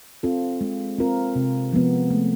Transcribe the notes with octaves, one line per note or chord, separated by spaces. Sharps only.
C4 F4 A4
G#3
C4 F4 A#4
C3
F3 G#3 B3
A3